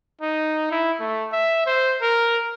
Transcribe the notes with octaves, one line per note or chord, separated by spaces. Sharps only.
D#4
E4
A3
E5
C5
A#4